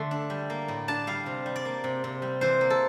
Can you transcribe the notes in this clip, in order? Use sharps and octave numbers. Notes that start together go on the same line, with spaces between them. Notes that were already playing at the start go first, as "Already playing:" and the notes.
Already playing: D3 A3 C6
D4
G3
A#3
A2
D4 A5
G3 F5
C3
G3
D5
A#3
C3
C3
G3
E3 C5
A#3
A4